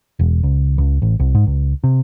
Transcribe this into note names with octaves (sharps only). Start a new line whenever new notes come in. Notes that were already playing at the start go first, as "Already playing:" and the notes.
E1
C#2
C#2
A1
C2
G#2
C#2
C3